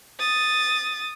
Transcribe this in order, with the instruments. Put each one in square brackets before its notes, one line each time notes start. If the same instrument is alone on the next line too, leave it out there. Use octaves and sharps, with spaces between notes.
[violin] D#6 A6